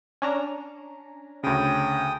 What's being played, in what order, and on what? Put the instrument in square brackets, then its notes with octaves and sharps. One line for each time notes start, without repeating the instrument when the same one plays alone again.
[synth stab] C#4 D4 A#5
[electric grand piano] D2 C#3 [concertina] G5 D#6